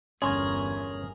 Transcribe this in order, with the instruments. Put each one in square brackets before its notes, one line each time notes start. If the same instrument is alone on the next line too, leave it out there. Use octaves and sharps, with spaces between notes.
[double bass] G1 E2 [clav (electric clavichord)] C#4 [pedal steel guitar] G#4 A#4 [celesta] C6 C#6 G#6